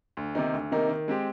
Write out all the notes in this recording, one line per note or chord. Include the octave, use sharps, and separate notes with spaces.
D2
C3 D#3 A#3 D#4
D2
C3 D#3 A#3 D#4
D#3
G#3 C4 G4